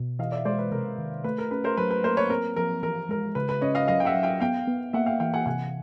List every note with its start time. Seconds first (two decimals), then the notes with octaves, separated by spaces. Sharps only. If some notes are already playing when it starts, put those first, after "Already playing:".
Already playing: B2
0.19 E3 D#5 F5
0.32 D5 E5
0.45 G#3 C5 D5
0.59 B4
0.72 C3 A#4
0.98 D#3
1.24 A3 B4
1.38 A#4
1.51 C#4 B4
1.64 A#4 C5
1.77 F#3 B4
1.91 B4
2.04 A#3 A#4 C5
2.17 B4 C#5
2.30 C4 A#4
2.56 F3 A#4
2.83 E3 A#4
3.09 G#3 A#4
3.35 C#3 B4
3.49 B4
3.61 C#4 C#5 D#5
3.75 D#5 F5
3.88 F#3 D#5 F5
4.00 G5
4.05 E5 F#5
4.14 F#3
4.23 F5 G5
4.40 B3 F5 G5
4.67 B3
4.93 A#3 E5 F#5
5.06 F5 G5
5.20 E3 F5 G5
5.34 F#5 G#5
5.46 C3 F#5 G#5